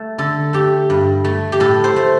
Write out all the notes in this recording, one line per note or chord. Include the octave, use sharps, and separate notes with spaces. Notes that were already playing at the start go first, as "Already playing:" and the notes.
Already playing: A3
D3 A4
A3 G4
G2
A3
G4
A2 A4
C5
A3